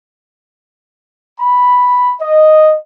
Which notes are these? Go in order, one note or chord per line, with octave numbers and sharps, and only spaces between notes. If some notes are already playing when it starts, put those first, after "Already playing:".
B5
D#5